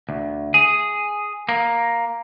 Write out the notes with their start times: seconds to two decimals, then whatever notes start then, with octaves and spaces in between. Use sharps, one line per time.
0.09 D2
0.54 G#4
1.49 A#3